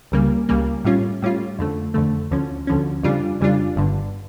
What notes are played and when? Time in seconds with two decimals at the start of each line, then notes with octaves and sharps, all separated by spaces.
0.12 C#2 C#3 G3 A#3
0.49 C#2 C#3 G3 A#3
0.85 A2 G3 C#4 F4
1.22 A2 G3 C#4 F4
1.59 F2 D3 A3
1.94 F2 D3 A3
2.31 D2 D3 F3 C#4
2.67 D2 D3 F3 C#4
3.03 F2 C#3 G3 D4 F4
3.40 F2 C#3 G3 D4 F4
3.76 G1 G2 D3